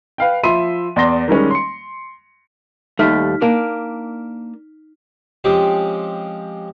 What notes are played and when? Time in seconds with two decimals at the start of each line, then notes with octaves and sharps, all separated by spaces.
0.18 B4 F5 G5
0.43 F3 E5 B5 C6 D#7
0.96 E2 D5 C6 A#6 G7
1.28 D#3 G3 G#3 C#4
1.51 C6 C#7
2.99 D#2 G3 A3 D#4 F6 B6
3.41 A#3 D4
5.44 F3 G#3 C4 C#4 G4